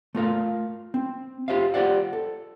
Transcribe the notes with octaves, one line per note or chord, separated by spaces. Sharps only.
A3 F4 A#4 F5
C4
F4 G4 C5 E5 F5
F4 G4 C5 D5 F#5
A4